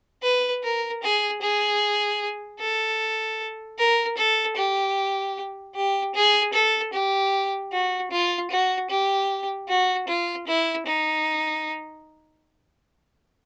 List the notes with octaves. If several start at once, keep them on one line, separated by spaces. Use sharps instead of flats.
B4
A#4
G#4
G#4
A4
A#4
A4
G4
G4
G#4
A4
G4
F#4
F4
F#4
G4
F#4
F4
E4
D#4